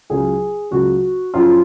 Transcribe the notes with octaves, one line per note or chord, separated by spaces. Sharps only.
C#2 C#3 F#3 G#4
C#2 C#3 F#3 F#4
F#2 F3 F4